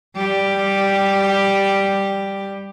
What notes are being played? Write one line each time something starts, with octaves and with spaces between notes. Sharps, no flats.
G3 G4